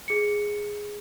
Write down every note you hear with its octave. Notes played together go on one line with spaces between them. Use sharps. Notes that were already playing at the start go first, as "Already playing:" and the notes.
G#4 C#7